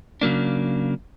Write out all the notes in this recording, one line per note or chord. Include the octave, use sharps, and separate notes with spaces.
C#3 F#3 A#3 D4